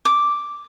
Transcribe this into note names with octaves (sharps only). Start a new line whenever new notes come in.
D6